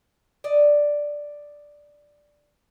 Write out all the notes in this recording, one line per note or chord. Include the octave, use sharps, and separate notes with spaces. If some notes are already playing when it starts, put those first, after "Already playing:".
D5 D#5